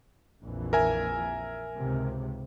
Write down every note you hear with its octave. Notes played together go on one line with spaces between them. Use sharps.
A#1 F2 E3
A#4 E5 G#5
C#2 G#2 C3